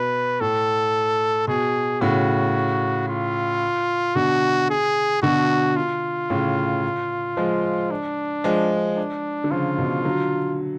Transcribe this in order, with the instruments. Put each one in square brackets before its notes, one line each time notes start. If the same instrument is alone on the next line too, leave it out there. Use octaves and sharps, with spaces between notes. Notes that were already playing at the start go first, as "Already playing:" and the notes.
Already playing: [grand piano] B2 [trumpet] B4
[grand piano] A2 [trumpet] A4
[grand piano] B2 [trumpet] G#4
[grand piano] A2 C#3 [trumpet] F#4
[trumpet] F4
[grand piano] B2 D3 [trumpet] F#4
[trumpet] G#4
[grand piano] B2 D3 [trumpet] F#4
[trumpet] F4
[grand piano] A2 C#3
F3 G#3
[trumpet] D4
[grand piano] F3 G#3
[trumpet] D4
[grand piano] D3
[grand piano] C#3 F3 [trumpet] F4
[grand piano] B2 D3
D3 F#3